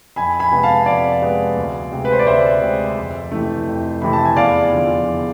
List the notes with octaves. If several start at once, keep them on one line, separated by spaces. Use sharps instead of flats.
F2 G#5 B5
G#5 B5
C3 G#3 B3
F5 A5
F2 D5 F5
C3 G#3 B3
D2
C3 G#3
B4
C5
D5
D2 C5 E5
C3 G#3
F2
C3 E3 A3
F2
C3 E3 A3 B5
A5
G#5
E2 D5 F5
D3 F3
E2